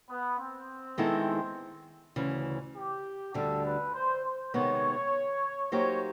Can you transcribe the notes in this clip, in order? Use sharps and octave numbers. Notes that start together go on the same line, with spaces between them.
B3
C4
D#3 G#3 B3 E4 A4
D2 C#3 E3
G4
D2 D3 G3 A4
B4
C5
C5
C3 D#3 G#3 B3 C#5
F#3 A#3 D#4 G4 C5 C#5